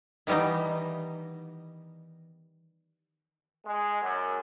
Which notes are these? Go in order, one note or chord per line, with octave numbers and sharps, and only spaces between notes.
D#3 E3 G3 B3 D#4
G#3
F#2